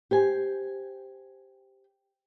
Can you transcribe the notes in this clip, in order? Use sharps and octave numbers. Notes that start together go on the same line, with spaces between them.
G4 C5 G#5